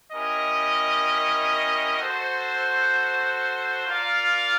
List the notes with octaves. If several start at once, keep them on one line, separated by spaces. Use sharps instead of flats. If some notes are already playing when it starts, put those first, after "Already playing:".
C#4 E4 G4 A#4 D#5
F#4 A4 C5
F4 A#4 D5 F5